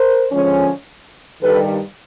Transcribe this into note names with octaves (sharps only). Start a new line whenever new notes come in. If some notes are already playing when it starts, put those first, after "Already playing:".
Already playing: A#4 C5
D3 F3 G#3 C#4
G2 D#3 G3 A4 B4